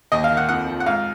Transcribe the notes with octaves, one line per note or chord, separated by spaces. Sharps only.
D#2 D#5
F5
D#3
F#5
F2 F#5
F3
F#5
G#2 F5